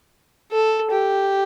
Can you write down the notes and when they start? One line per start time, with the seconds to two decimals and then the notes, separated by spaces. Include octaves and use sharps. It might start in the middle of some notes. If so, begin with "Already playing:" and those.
0.52 A4
0.91 G4